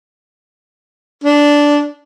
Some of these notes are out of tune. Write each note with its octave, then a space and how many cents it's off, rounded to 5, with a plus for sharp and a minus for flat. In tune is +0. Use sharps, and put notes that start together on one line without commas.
D4 -10